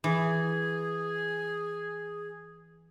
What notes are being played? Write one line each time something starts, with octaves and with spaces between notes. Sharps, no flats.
E3 G#4